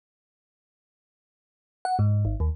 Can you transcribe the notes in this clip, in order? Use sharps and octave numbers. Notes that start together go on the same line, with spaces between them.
F#5
G#2
G#1
D#2